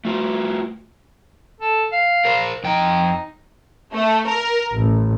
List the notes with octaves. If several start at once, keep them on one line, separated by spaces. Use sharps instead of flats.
A3 F4 F#4
A4
F5
A#4 C5
F2 D#4 G5
A3
A#4
A1